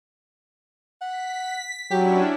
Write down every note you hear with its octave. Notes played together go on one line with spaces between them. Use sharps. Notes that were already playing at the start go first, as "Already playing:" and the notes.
F#5 B6
F#3 C#4 D4 E4 G4